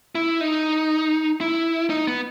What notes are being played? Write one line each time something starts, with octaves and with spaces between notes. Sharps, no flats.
E4
D#4
E4
D#4
B3